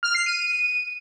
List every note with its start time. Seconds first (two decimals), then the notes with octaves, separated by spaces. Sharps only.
0.03 F6
0.14 C7
0.26 D#7